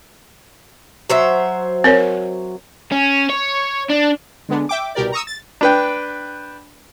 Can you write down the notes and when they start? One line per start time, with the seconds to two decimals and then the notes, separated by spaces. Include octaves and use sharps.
1.10 F#3 C5 E5
1.84 C4 A#4 C#5
2.92 C#4
3.29 C#5
3.90 D4
4.49 D3 G#3 B3 D4
4.69 E5 G5 D6
4.95 C2 B2 G4 A#4 D5
5.12 A#5 C#6 D#6 E6
5.27 A6
5.61 D4 B4 G5